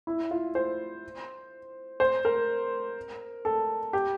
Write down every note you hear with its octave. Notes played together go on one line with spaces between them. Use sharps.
E4
F4
C5
C5
A#4
A4
G4